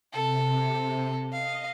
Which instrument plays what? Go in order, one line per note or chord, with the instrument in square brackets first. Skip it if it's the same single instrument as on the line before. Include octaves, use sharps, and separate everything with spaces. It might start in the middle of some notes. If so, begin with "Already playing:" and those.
[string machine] C3 [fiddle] A4
[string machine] D#5 [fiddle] F5